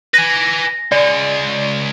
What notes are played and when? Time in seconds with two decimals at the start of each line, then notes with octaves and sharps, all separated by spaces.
0.14 B4 G#5 A#6
0.92 C#2 G#3 D5